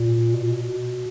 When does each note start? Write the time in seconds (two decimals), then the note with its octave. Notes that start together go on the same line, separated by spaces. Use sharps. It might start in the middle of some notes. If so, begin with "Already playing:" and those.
Already playing: A#2
0.33 B2
0.42 A#2
0.50 B2